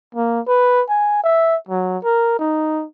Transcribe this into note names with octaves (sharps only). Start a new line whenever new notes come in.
A#3
B4
G#5
E5
F#3
A#4
D#4